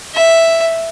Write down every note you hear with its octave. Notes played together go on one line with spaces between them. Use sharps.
E5